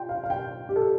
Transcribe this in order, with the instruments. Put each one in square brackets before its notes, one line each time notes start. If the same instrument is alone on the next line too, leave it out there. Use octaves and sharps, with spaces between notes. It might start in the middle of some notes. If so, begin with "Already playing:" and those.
Already playing: [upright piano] F4 G5
F5
F5
G5
G4
A4